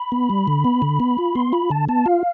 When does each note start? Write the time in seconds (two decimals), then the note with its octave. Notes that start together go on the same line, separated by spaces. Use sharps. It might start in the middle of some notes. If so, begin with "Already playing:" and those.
Already playing: B5
0.12 B3
0.30 G3
0.48 D3
0.64 B3
0.82 D3
1.00 B3
1.18 F4
1.35 B3 C6
1.52 F4 B5
1.70 D3 A5
1.89 B3 A5
2.06 F4 F5